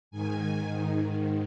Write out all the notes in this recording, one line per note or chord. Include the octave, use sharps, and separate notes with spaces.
G#2 D#3 G#5